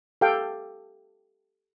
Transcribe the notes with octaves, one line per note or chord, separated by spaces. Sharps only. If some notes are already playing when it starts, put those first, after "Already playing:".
G4 A4 F5 G5